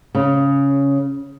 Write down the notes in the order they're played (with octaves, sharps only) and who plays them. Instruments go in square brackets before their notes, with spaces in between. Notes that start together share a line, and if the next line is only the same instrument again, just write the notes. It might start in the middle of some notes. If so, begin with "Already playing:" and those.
[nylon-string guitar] C#3